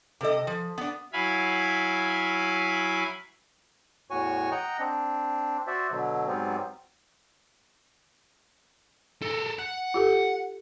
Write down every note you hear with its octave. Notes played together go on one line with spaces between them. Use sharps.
C3 G3 A4 D#5
F3
B3 D4
F#3 E4 F5 G#5 B5
E2 A2 F#4 C#5 G#5 C#6
D#5 F#5 G5 A#5
C4 D4
F#4 C5 D5 E5
B2 D3 F#3
G#2 F#3 G3 B3 C4
A4 A#4
F#5
F4 G4 A4